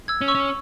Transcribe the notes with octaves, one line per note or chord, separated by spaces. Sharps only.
E6 G#6
C#4
C#6 E6
C#4